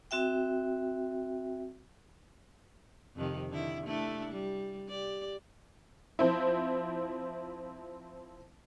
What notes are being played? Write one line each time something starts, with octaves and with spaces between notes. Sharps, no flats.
C4 F#4 E5 G5
F2 C3 D#3
D3 D#3 E4
A3 D4 E4
G3
G4 D5
F3 C4 E4